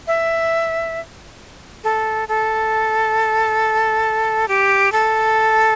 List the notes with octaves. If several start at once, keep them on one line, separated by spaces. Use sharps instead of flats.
E5
A4
A4
G4
A4